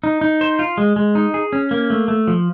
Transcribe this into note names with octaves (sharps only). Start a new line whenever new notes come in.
D#4
D#4
C5
F4
G#3
G#3
D#4
G#4
C#4
A#3
A3
A3
F3